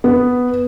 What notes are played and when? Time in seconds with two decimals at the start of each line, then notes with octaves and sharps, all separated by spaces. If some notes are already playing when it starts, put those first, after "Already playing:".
0.04 B3